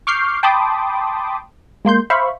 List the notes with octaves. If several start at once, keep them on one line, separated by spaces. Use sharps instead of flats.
C#6 D6 F6 G6 C7
G5 A5 B5 C6 D6 D#6
G#3 A#3 C6 G6
C5 E5 F5 B5 C#6